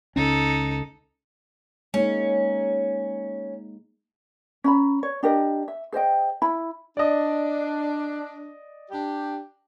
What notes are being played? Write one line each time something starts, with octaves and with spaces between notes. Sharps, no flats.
C#2 C#4 D#4 A4
G#3 A#3 C#4 D#4
C#4 A#5 B5
C#5
D4 G4 A#4 D#5
E5
G#4 C5 D#5 G5
E4 B5
D4 D5 D#5
D4 G4